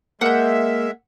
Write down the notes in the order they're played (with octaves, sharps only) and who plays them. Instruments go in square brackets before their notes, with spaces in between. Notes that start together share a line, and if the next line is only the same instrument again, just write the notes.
[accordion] G#3 E5 [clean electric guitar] A#3 [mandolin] F#5 G6